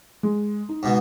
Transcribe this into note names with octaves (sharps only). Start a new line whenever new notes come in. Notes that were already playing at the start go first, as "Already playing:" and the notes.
G#3
D#4
G#2 B2